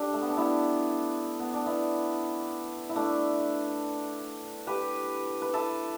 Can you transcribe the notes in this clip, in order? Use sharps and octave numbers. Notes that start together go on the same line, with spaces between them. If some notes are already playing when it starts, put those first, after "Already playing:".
Already playing: D4 G4 A4
A3
B3
D4
B3 E4
B3
D4
B3 E4
E4
A3 D4
G4 B4
B4
E4 A4